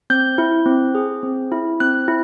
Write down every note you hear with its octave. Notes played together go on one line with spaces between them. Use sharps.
C4 G6
E4
C4
G#4
C4
E4
C4 F#6
E4